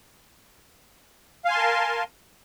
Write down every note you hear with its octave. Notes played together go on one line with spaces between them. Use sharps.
A#4 F5 G#5 A5 C6